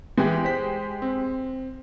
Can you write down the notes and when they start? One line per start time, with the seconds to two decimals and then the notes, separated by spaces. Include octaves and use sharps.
0.17 E3 G#3 G4
0.45 C5 B6
1.02 C4